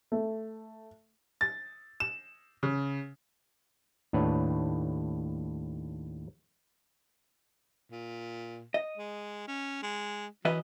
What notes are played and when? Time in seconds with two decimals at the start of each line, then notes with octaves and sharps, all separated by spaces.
0.12 A3
1.41 A6
2.00 E7
2.63 C#3
4.13 D#2 A2 D4 B4 C#5
7.91 A#2
8.74 D#5
8.97 G#3
9.48 C#4
9.83 G#3
10.45 E3 F#3 B4 D#5